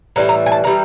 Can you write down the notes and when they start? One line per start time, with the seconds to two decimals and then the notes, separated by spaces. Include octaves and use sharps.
0.16 A2 E3 G3 A#5
0.29 A#5
0.46 G#5
0.52 A5
0.64 A2 E3 G3 A#5